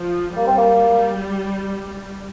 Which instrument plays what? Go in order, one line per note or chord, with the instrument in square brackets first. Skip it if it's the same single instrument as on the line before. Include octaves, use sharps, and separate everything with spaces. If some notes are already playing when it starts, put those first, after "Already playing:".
Already playing: [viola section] F3
[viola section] G3 [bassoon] A#3
[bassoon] C4
A#3